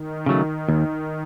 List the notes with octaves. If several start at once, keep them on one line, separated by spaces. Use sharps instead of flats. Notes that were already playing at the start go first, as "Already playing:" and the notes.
Already playing: D#3
C#3 F#3 A3
D#2